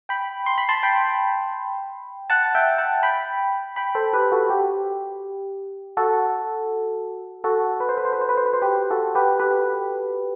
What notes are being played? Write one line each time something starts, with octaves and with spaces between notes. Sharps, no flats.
G5 B5
C6
B5
A5 C6
G5 B5
F#5 A5
E5 G5
F#5 A5
G5 B5
G5 B5
A4 C5
G4 B4
F#4 A4
G4
F#4 A4
F#4 A4
B4
C5
B4
C5
B4
C5
B4
C5
B4
C5
G4 B4
F#4 A4
G4 B4
G4 B4